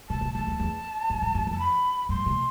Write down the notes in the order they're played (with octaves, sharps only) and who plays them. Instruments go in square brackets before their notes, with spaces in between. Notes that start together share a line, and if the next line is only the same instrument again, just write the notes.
[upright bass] B2 [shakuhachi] A5
[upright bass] A2
[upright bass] F2 [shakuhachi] A5
[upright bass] E2
E2
G2
A2
G2
[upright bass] F2 [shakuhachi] A5
[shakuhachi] B5
[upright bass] G2 [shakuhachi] C6
[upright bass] B2